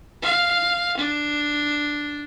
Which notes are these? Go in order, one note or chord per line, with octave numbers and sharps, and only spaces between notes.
F5
D4